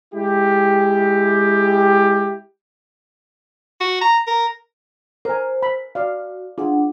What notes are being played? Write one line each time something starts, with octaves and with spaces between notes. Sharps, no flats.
G#3 E4 G4
F#4
A#5
A#4
A#4 C5 G#5
B5
F#4 D5 F5
D4 F4 G#4 F#5